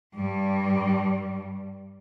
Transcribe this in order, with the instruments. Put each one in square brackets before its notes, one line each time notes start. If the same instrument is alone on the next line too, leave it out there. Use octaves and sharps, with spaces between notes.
[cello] G2 G3